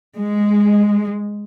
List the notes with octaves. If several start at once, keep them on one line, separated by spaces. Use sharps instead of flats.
G#3